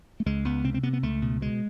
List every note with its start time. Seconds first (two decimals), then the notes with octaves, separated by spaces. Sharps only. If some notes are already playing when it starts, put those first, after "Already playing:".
0.20 A3
0.26 C#2 G#3
0.45 C#2 B3
0.64 C3 C4
0.74 C4
0.83 C3 B3
0.93 B3
1.03 C#2 A3
1.22 B2
1.41 B2 G#3